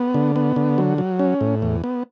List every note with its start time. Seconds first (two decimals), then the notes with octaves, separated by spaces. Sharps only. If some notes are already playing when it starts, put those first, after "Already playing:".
Already playing: B3
0.14 D3
0.36 B3
0.56 D3
0.78 F#3
0.98 F#3
1.19 C#4
1.41 A2
1.62 E2
1.84 B3